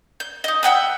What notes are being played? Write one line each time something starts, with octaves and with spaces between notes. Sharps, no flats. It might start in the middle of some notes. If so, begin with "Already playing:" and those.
G6
D#4 D#5
E5 F#5 G5 D#6